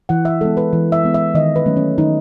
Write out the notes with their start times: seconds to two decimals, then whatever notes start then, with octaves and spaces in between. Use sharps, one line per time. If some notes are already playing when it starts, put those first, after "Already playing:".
0.09 E3 F#5
0.25 E5
0.41 G#3 B3 A4
0.57 B4
0.73 E3
0.92 E5
1.04 G#3 B3
1.14 E5
1.35 D#3 D#5
1.56 B4
1.66 F#3 A3 C#4
1.77 C#4
1.98 D#3 D#4